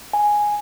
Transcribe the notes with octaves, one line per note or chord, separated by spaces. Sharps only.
G#5